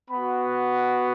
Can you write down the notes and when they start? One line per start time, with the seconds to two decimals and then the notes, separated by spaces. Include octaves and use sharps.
0.11 B3 F#4 B5